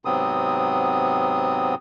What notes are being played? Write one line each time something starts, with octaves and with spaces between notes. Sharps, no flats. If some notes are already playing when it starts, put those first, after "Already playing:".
G#2 C3 F#3 B3 C4 D#6